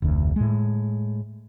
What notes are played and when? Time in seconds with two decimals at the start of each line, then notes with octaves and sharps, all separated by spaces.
0.02 F1 D2
0.36 A2 G#3